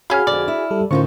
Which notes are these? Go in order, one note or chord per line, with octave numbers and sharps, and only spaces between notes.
C#4 F#4 G#4 F5 G#5 B5 F6
F2 D3 D5
E4
G3 A4
A2 D3 D#3 C#4 D#4 F4 C5 C#6